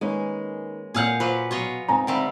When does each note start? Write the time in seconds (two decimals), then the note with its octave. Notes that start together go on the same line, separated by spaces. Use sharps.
0.01 D#3 G#3 A#3 C#4 B4
0.94 A#2 G#4 F5 F#5 F6 G6
1.20 F#3 F4 B4 C5 F5 D6
1.51 B2 F#3 F4 F#4 C#5 D#5
1.88 C#2 C4 D#4 G#5 A#5
2.07 D3 G3 A3 C4 D#4 B4